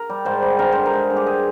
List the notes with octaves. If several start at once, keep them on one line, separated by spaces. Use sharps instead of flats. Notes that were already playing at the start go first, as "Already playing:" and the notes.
Already playing: A#4
G3
G#2 C5
G3
G2 A#4
D3 C5
A#4
G#3
G2
G4
G#4